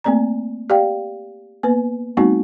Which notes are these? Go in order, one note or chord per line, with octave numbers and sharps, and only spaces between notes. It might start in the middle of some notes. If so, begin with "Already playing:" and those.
A3 A#3 C4 D5 A#5
G4 D5 F5 G5
A#3 B3 B4
G3 A3 B3 C4 D#4 F#4